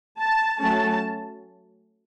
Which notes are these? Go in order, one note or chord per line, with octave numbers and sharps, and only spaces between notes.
A5
F#3 A3 C#4 A5